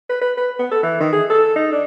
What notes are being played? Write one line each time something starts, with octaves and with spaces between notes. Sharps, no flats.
B4
B4
B4
B3
A4
E3
D#3
G#4
A4
D#4
D4